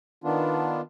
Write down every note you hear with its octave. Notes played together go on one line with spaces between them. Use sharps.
D#3 B3 D4 F4